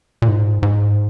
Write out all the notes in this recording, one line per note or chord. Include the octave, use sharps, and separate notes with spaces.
A#2
G#2
G#2